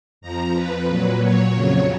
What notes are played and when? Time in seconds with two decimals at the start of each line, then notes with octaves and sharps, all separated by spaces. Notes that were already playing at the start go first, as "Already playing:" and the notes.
0.21 F2 F3 A#5
0.54 B4
0.88 A#2 F#3
1.21 C#5
1.55 F2 C#3 F#3